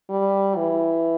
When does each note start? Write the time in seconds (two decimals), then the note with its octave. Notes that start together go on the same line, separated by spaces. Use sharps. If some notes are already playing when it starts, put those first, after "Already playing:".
0.10 G3
0.56 E3